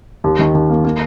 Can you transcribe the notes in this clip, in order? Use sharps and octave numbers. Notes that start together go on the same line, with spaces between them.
D#2
D#3
D#2
A#3
A#3